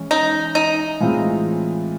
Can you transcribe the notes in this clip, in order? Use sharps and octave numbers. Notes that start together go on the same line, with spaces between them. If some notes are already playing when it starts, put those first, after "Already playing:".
Already playing: E3 G#3 C#4
D#4
D#4
A2 E3 G#3 C4 F4